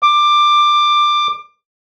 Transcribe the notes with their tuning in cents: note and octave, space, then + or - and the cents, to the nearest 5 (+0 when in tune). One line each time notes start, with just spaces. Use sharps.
D6 +15